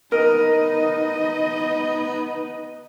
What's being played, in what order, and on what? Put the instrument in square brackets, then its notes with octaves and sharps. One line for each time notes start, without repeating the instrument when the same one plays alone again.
[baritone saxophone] B3 [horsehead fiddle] D#4 D#5 [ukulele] A#4